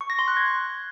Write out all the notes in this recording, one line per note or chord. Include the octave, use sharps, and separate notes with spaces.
C#6
A#6
C6
F#6
G#6